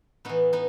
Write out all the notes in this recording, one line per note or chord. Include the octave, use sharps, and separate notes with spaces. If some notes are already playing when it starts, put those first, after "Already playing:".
A2 E3 B3 D#4
B3 D#4